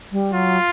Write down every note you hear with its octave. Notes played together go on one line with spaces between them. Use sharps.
G3
F#3 F4